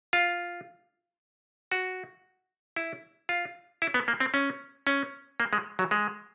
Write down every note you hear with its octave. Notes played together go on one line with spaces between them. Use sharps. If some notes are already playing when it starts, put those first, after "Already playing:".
F4
F#4
E4
F4
E4
B3
A#3
C4
C#4
C#4
A#3
G#3
F#3
G#3